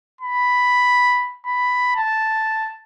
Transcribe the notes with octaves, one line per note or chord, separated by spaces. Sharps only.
B5
B5
A5